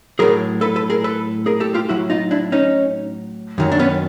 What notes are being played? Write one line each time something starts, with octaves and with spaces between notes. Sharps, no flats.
A2 F#3 G#4 A#4
A4 B4
A4 B4
G#4 A#4
A4 B4
G#4 A#4
G4 A4
F4 G4
A2 F#3 E4 F#4
D#4 F4
D4 E4
C#4 D#4
F#2 D#3 F#3
D4
B3 C#4